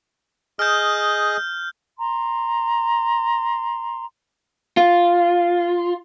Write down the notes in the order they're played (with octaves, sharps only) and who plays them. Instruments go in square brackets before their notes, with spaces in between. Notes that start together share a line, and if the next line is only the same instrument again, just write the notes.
[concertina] G#4 D#5 [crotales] F6 G6
[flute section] A#5 C6
[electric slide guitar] F4